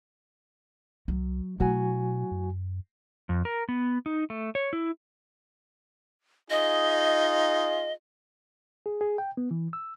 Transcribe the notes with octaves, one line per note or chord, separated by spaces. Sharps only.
C2 F#3
B2 F#3 A3 E4 F#4 G#5
F#2
F2
A#4
B3
D#4
A3
C#5
E4
D#4 F4 G#4 D#5
G#4
G#4
G5
B3
E3
E6